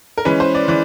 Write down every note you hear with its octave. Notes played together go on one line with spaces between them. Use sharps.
A#4
E3 G#3 C#4 B4
C5
D5
E3 D5